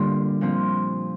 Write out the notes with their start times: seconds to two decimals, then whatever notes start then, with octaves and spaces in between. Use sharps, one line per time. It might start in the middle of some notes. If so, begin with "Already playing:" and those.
Already playing: D3 G3 A#3 D4 F4 G4
0.41 A#2 F3 C4 F4